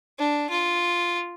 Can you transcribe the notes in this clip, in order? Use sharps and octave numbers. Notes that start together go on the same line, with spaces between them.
D4
F4